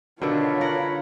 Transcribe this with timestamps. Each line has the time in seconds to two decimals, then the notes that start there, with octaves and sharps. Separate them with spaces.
0.22 B2 D3 D#3 D4 F4 C#5 B5
0.61 A#4 F#5